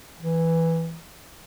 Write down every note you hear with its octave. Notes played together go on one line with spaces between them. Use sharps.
E3